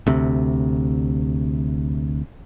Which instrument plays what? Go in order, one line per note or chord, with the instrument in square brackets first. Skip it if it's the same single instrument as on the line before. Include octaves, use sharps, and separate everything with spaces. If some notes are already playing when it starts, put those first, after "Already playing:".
[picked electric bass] D2 C3